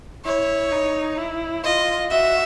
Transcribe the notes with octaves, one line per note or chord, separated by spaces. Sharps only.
E4 C#5
D#4
E4
F4 D#5
F#4 E5